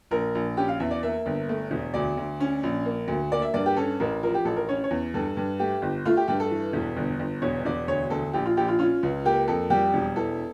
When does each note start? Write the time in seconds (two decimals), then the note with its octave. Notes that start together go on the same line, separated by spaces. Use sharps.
0.11 A#1 A#4
0.35 A#1
0.57 C#4 G4
0.68 F5
0.80 E2 E5
0.91 D5
1.03 A#3 E5
1.26 G1
1.49 A3
1.71 E1
1.94 D2 D5
2.17 D2
2.40 C#4
2.63 A#1
2.85 A#3
3.08 D2
3.32 A#3 D5
3.42 E5
3.54 G2 D5
3.66 G4
3.77 C#4 A4
4.00 A1 A#4
4.23 F3 A#4
4.34 G4
4.45 A1 A4
4.56 A#4
4.69 C#4 C#5
4.84 C#5
4.91 E2
5.14 G2 A4
5.37 G2
5.59 A3 G4
5.82 G1
6.06 A3 F4
6.17 G4
6.28 G2 G4
6.40 A4
6.51 E3
6.73 E1
6.96 G1
7.19 G1
7.42 E1 C#5
7.65 E1 D5
7.88 D2 C#5
8.10 D2 A4
8.33 A#1 G4
8.46 F4
8.57 A#1 G4
8.68 F4
8.79 C#4 F4
9.03 C#2
9.25 A#3 G4
9.48 F2 A4
9.70 G3 G4
9.94 E1
10.16 E3 A4